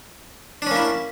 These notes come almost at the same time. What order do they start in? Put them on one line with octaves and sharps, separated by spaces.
D4 C#4 A#3 E4